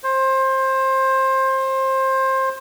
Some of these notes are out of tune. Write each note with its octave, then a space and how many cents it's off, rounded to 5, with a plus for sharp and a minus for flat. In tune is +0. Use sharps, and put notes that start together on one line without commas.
C5 +20